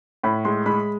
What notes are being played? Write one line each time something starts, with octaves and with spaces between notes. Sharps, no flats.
A2 B5
G#3 C6
G#3 B5